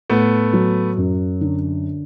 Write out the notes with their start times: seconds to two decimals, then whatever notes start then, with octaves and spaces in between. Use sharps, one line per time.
0.10 A2 A3 B3
0.53 F#3
0.97 F#2
1.41 D3